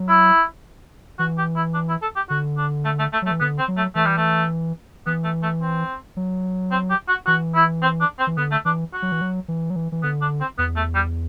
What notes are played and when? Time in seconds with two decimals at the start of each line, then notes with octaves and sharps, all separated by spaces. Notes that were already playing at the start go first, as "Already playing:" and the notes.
Already playing: F#3
0.08 E4
1.19 E3 F#4
1.38 G4
1.56 E4
1.74 D4
1.89 E4
2.02 A4
2.16 G4
2.30 D3 F#4
2.57 D4
2.85 A3
2.99 A3
3.13 A3
3.22 F#3
3.26 A3
3.31 E3
3.40 D3 B3
3.59 C4
3.68 F#3
3.77 A3
3.95 E3 A3
4.06 G3
4.17 A3
5.06 E3 B3
5.24 A3
5.43 A3
5.61 C4
6.17 F#3
6.71 C4
6.90 G4
7.08 F#4
7.27 E3 F#4
7.55 E4
7.82 C4
8.01 D4
8.19 C4
8.27 E3
8.37 D3 B3
8.51 A3
8.65 E3 D4
8.93 F#4
9.02 F#3
9.12 E3
9.21 F#3
9.48 E3
9.70 F#3
9.76 E3
9.92 E3
10.03 D3 B3
10.21 D4
10.41 C4
10.58 E2 B3
10.76 A3
10.95 G3